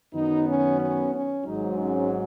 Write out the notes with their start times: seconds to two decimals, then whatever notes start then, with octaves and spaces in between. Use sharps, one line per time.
0.14 F#2 D#3 F#3 B3 D#4
0.46 C#4
0.79 C#4
1.12 C#4
1.45 G#1 G#2 F#3 D#4
1.78 C#4